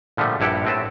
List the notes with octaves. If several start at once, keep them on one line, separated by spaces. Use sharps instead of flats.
A#2 D3 F3 G3 A3
A#1 G2 E4 G4 F#5
A2 C4 B4 A5